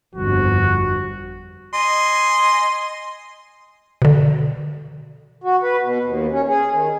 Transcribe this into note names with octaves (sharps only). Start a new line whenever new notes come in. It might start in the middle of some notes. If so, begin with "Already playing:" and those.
G1 F2 F#4
D#5 G#5 C6
B2 D3
F#4
B4
B2
D#2
C#4
G#4
D#3